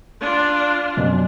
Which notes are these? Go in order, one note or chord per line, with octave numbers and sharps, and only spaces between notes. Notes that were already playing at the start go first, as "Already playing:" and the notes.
D4 F4
F#2 B2